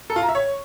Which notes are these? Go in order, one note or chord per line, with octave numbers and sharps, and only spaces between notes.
A4
F4
A#5
E5
C#5